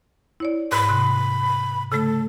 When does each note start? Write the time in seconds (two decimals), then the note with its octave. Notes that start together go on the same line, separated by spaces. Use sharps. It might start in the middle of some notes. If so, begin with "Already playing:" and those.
0.40 E4 C#5 D5
0.72 G#2 B5
0.89 C3 C6 F#6
1.92 C#3 A3 A4